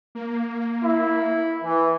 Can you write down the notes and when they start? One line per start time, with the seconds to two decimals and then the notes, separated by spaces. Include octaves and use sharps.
0.15 A#3
0.83 E4
1.64 E3